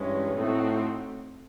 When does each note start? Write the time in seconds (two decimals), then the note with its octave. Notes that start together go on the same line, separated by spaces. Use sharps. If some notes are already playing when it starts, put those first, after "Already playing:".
Already playing: G2 E3 G#3 C#4
0.36 A2 A3 C4 D#4 F#4